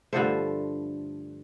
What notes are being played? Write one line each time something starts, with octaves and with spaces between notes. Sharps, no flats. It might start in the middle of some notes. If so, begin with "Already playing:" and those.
G2 D3 F3 A3 C5